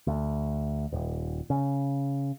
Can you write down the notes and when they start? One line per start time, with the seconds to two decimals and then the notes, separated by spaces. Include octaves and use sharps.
0.07 D2
0.92 D#1
1.50 C#3